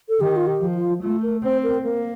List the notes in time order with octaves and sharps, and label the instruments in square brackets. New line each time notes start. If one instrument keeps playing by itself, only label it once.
[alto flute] A4
[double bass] D#3 [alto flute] G4
[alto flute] F4
G4
[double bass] F3
[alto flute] F4
[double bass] A3 [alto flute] F4
[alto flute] A#4
[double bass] C4 [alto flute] C5
[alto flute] A#4
[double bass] A#3 [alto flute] A#4